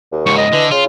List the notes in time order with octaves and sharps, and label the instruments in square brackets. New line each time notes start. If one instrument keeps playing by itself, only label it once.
[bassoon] D#2
[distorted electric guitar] C#2 G#2 [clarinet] C#6
[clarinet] D#5
[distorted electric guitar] D3 [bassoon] E3
[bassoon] C#3 [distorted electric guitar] F4